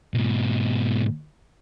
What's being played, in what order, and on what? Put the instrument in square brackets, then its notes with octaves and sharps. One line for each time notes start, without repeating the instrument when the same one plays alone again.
[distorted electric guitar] G#2 B2